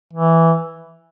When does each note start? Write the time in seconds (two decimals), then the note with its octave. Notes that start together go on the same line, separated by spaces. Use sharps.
0.13 E3